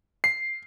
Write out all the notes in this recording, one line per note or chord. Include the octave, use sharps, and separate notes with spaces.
C7